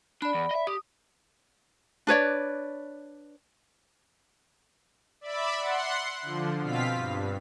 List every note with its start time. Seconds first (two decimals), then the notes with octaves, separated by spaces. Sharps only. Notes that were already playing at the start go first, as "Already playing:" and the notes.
0.22 D4 D5 B5
0.34 E2
0.51 D#5 E5
0.67 G4 D#6
2.07 D4 B4 C#5 D5
5.21 D5 E5 B5
5.59 F#5 C6
6.22 D3 F3
6.62 B2 C4 F4 F5 B6
6.95 G2